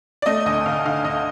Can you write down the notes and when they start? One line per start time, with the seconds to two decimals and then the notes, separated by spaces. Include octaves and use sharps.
0.22 D5
0.26 A3 D#5
0.46 D2 D#5
0.66 D2 F5
0.85 D3 F5
1.05 D2 D#5